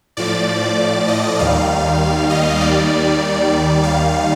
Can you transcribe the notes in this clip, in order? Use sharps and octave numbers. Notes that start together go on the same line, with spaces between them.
A2 F3 D5
D#5
D#2 D#3 G3 F5
D#5
D#2 D#3 G3 D5
D#2 D#3 G3 F5